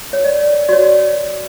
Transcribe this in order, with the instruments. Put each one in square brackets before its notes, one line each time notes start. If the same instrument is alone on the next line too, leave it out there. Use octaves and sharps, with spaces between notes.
[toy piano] C#5
D5
F#4 C#5 D5